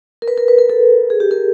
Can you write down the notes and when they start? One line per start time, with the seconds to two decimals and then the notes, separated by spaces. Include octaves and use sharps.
0.22 A#4
0.28 B4
0.37 A#4
0.48 B4
0.58 A#4
0.70 A4
1.10 G#4
1.20 G4
1.31 A#4